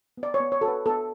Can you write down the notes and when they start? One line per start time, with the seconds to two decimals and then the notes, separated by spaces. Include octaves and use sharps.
0.17 B3
0.23 D5
0.34 C#5
0.40 B3
0.52 C#5
0.61 F#4 A4
0.68 B4
0.86 B3 A4